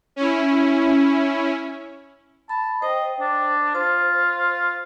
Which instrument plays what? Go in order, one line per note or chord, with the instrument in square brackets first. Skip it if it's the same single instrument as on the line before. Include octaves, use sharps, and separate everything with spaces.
[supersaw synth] C#4 E4
[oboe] A5 [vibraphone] B5
[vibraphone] C5 G5 [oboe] D#5
[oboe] D4
[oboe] F4 [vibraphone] C5